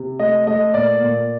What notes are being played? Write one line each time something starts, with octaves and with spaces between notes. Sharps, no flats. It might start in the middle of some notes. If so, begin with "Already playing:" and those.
Already playing: C3
A3 D#5
A3 D#5
A#2 D5
A#2